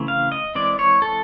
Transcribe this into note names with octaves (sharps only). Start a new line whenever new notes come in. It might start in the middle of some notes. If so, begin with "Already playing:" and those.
Already playing: C#3 E3 A3 C4
F5
D#5
E3 G#3 C4 D5
C#5
A4